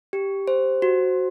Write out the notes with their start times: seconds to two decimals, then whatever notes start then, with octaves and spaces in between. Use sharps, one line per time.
0.13 G4
0.48 C5
0.82 F#4